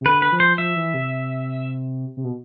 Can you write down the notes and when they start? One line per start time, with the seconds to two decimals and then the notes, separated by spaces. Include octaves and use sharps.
0.01 C3
0.05 D3 B4
0.22 B4
0.32 F3
0.40 C5
0.58 F3 E5
0.76 E3
0.94 C3
2.17 C3
2.24 B2